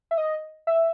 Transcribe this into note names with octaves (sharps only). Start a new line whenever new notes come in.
E5
D#5
E5